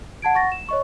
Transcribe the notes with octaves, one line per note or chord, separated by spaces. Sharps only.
F#5 A5 G#6 D7
F#5 C#6 A6 A#6
E7
C#5 D#5 C#6